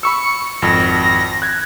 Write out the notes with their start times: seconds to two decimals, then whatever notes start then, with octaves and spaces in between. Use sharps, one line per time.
0.03 B5 C#6 E6 C#7
0.62 G#1 F2 A#6
1.42 F#6 G#6